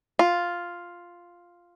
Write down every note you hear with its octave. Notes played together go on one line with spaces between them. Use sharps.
F4